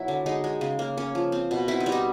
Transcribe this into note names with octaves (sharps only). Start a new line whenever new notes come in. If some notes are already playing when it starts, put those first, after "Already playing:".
Already playing: B2 F#3 E4
D3
G#3 D#4
G#3
C#3
A#3
C#4
F3
C4
B2
C4 E4
D#4
G3
D#4